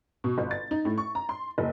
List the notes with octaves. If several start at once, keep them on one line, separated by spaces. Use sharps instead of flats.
B2
G1
A6
D#4
A2
C#6
A#5
C6
F#1